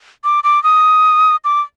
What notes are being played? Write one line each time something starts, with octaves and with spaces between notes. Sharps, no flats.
D6
D6
D#6
D6